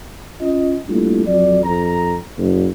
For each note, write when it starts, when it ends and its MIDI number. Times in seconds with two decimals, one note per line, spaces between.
0.40 0.75 61
0.40 0.75 65
0.40 0.75 75
0.89 1.23 55
0.89 1.23 57
0.89 1.23 58
0.89 1.23 62
0.89 1.23 64
0.89 1.23 65
1.27 1.62 41
1.27 1.62 54
1.27 1.62 74
1.64 2.15 41
1.64 2.15 82
2.38 2.67 30